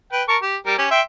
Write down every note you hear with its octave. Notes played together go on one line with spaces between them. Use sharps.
B4 G5
A#4 A5 C#6
G4
G3 A#4
C#4 G4
E5 G5 C6